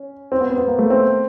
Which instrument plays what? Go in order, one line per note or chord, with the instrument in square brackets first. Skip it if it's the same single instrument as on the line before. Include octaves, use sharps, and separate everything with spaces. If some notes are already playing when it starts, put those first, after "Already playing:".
Already playing: [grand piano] C#4
C4
B3
C4
B3
A#3
A3
C4